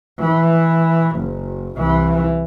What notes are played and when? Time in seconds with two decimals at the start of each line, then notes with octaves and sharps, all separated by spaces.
0.20 E3
1.17 F#1
1.77 C2 E3